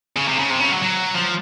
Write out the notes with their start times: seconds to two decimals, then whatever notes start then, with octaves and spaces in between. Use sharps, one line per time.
0.17 C#3
0.27 C3
0.39 C#3
0.50 C3
0.60 C#3
0.72 F#3
0.82 F#3
1.15 F3